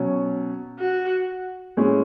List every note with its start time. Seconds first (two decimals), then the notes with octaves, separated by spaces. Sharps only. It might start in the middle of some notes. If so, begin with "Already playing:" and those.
Already playing: B2 F#3 C#4
0.80 F#4
1.77 A2 G#3 C#4